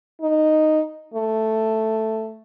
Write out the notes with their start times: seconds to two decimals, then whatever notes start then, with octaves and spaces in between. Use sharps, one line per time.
0.21 D#4
1.14 A3